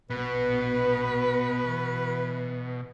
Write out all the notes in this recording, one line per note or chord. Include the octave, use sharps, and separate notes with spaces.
A#1 B2 B3 B4
E3